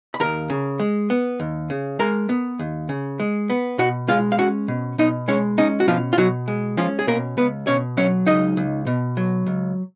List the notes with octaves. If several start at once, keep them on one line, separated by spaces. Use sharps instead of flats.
B5
D#2 A#4 A#5
C#3
G#3
B3
D#2
C#3
G#3 A#4 A#5
B3
D#2
C#3
G#3
B3
B2 F#4 F#5
G#3 F4 F5
F5
C#4 F#4 F#5
B2
B2 D#4 D#5
G#3 C#4 C#5
C#4 D#4
F#4
B2 F3 F4
F4
B2 F#3 F#4
G#3
F3 C#4 F4
G#4
B2 A#3 A#4
C#2 B3 B4
B2 C#4 C#5
F#3 C#4 C#5
C#2 D#4 D#5
C#2
B2
F#3
C#2